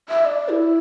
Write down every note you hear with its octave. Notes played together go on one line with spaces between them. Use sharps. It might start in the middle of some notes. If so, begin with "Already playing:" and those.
E5
D5
E4